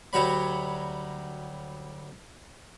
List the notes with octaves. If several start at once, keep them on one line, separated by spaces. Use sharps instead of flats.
D2 F#3 G3 F#4 C#5 B5